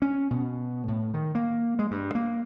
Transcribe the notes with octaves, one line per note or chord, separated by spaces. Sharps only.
C#4
B2
A2
D#3
A#3
G#3
G2
A#3